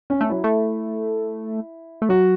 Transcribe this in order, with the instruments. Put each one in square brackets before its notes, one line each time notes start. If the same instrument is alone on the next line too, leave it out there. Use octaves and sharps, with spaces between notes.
[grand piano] C#4
[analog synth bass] A3 [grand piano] C#4
[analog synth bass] F#3 [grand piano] E4
[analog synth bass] A3
A3
[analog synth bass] F#3 [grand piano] F#4